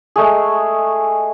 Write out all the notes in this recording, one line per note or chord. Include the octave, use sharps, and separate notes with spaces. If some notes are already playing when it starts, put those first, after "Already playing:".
G#3 A3 G#4